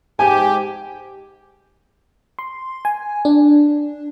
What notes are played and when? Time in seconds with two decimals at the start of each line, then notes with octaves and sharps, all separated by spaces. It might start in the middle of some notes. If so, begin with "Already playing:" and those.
0.19 G#2 G4 G#5
2.39 C6
2.85 G#5
3.25 D4